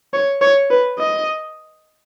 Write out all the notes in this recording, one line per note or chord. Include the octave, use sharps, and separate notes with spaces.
C#5
C#5
B4
D#5